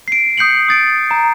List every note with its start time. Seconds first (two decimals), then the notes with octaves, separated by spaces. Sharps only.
0.08 C7 D7
0.38 D#6 G6 C7 C#7 F#7
0.69 D#6 A6 D7
1.11 A#5